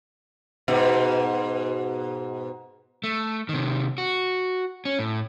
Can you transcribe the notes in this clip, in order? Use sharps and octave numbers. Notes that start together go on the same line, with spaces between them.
G#2 B2
A3
C3 D#3
F#4
C#4
A2